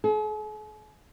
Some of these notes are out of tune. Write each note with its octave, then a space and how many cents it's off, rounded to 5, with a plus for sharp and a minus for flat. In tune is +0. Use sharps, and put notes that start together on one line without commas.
G#4 +45